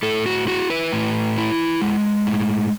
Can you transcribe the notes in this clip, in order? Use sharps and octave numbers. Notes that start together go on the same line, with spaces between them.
A2 A4
F#4
E4 F#4
B4
A2
E4
G#3
A2